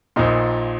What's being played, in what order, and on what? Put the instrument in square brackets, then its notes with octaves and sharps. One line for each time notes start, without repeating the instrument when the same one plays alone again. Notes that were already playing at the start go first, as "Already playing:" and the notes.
[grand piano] A#1 A#2 D#4